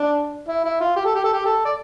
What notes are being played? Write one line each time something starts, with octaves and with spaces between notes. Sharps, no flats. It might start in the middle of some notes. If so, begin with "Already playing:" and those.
Already playing: D4
E4
E4
F4
G4
A4
G4
A4
G4
A4
D5